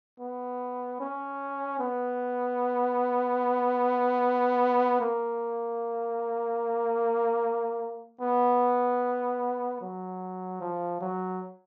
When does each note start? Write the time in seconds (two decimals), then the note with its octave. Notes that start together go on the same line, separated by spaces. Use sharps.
0.20 B3
1.00 C#4
1.80 B3
5.01 A#3
8.21 B3
9.81 F#3
10.61 F3
11.01 F#3